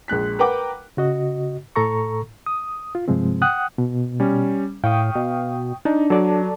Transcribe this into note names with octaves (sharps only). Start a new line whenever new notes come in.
A#1 G#3 F#6 B6
A#4 B4 F#5 G5 D6
C#3 F#4 D#5
A2 A4 A#5 C#6
D#6
F4
G2 C3 F3 G#3 C4
F#5 G5 D#6 F#6
B2
G3 C#4
A2 F5 G5 C#6 D#6
B2
D4 D#4
F#3 A4 D5 A5